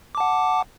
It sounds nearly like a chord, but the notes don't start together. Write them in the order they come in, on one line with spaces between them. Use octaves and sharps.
D6 A5 F#5